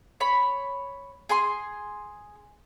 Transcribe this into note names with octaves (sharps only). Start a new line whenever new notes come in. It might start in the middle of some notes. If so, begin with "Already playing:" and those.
C#5 B5
G#4 G#5 C6